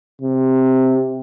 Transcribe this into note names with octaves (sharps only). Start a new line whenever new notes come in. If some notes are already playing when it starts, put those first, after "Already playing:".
C3